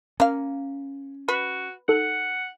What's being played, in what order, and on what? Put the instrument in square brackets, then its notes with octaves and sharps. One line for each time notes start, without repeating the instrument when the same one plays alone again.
[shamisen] A#3 F5 [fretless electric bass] C#4
[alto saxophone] F#4 [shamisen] B4
[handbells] D#4 A4 [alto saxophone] F#5